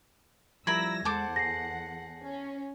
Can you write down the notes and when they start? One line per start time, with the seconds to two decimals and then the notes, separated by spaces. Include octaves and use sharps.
0.67 F3 G3 E4 A#4 B5 E6 G#6 A#6
1.05 E2 G#3 A4 C5 F#5 D6
1.36 G#4 A#6 C7
2.22 C#4